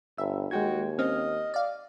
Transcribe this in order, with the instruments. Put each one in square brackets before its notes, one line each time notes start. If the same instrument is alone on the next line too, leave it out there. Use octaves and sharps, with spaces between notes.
[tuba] G1 [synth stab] E5
[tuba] D#2 [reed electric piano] G#3 G5 G#6 [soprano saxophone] F#4
[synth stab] C4 C#4 [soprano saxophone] D#5 [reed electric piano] F6
[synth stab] D5 F5